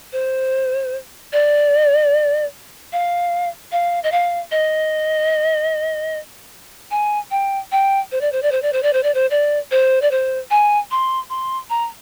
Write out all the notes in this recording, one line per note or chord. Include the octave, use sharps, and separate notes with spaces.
C5
D5
F5
F5
D#5
F5
D#5
G#5
G5
G5
C5
D5
C5
D5
C5
D5
C5
D5
C5
D5
C5
D5
C5
D5
C5
G#5
C6
C6
A#5